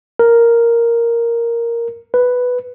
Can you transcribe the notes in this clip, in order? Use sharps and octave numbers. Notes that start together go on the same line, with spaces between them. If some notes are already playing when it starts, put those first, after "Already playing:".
A#4
B4